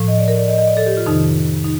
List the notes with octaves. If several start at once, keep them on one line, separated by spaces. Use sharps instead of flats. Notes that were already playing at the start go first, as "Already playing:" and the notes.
Already playing: A2 F3
D#5
D5
A#4
D5
D#5
D#5
D5
A4
G4
F4
F2 C3 D#3 D#4
D#4